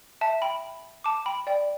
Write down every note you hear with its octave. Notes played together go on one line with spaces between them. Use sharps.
E5 A5
G5 B5
A5 D6
G5 B5
D5 G5